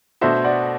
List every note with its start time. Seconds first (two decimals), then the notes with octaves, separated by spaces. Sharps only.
0.21 B2 A3 D4 F#4 C5 E5
0.44 D5 F#5